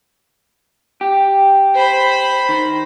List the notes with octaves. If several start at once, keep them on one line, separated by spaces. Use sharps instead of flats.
G4
C5 B5
D#3